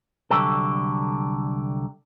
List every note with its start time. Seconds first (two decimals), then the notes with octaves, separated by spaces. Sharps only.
0.31 C2 D3 F#3 G4 A4